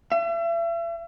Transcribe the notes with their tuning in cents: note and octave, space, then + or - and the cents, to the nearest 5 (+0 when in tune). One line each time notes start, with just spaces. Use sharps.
E5 +40